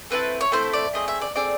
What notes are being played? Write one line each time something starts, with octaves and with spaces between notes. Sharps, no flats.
A3 C4 E4 A4 B4
C#5
A3 C4 E4 A4 C5
D5
A3 C4 G#4 D#5
E5
D5
A3 C4 G#4 D5